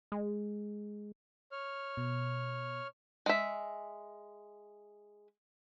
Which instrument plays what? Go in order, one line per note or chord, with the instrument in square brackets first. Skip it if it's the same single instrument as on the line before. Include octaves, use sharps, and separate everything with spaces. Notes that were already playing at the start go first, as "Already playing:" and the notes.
[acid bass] G#3
[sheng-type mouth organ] C#5 F6
[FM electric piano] B2
[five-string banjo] G#3 E5